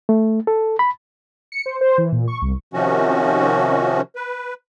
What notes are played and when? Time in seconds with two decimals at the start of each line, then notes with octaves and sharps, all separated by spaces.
0.09 A3
0.47 A4
0.79 B5
1.52 C#7
1.66 C5
1.81 C5
1.98 E3
2.12 A#2
2.28 C#6
2.42 C2
2.73 C3 D#3 F3 C#4 F#4
4.16 B4